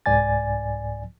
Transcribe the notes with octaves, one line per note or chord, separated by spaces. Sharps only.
C2 G#2 D5 G#5 A6